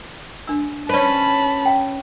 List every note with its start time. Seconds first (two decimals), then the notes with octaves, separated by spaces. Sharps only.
0.48 D4 E6
0.89 C#4 B4 C5 D5 A5 B5
1.65 F5 G5